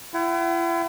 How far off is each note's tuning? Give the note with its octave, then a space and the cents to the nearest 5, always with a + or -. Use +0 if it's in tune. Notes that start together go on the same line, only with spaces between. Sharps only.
E4 +40 F#5 +40